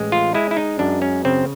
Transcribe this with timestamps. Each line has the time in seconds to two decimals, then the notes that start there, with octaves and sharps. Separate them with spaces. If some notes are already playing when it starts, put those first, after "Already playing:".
Already playing: A1 G#3
0.12 F4
0.34 G#3 E4
0.51 E4
0.57 D#4
0.79 F#2 D4
1.02 C#4
1.25 C#3 C4